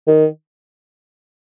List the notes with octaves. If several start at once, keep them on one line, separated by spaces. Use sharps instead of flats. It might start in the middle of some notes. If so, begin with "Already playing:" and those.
D#3